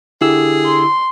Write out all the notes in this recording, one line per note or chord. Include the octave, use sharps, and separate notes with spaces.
D3 E4 G4 G#4 E6
C6